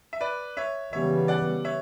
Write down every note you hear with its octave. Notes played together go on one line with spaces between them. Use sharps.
E5
B4 D5
C#5 E5
C#3 E3 G3 B3 C#5 E5
D5 F#5
C#5 E5